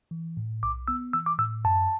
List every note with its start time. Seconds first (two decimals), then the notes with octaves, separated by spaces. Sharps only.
0.11 E3
0.37 A2
0.63 B1 D6
0.88 B3 E6
1.13 E3 E6
1.26 D6
1.39 A2 E6
1.65 F#2 A5